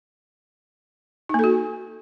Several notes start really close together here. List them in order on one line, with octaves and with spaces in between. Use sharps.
D#4 A#3 A4 F#4